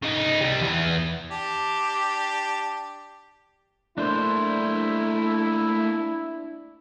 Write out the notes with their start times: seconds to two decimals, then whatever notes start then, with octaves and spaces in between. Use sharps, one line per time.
0.02 C#3 D#4
0.41 C2 G3
0.61 E2 E3
1.31 D4 G4
3.98 A3 A#3 D4 E4 C5